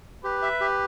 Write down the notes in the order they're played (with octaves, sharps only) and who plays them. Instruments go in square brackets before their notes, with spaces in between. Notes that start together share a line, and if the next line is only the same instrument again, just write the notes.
[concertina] G4 [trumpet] B4
[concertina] E5
G4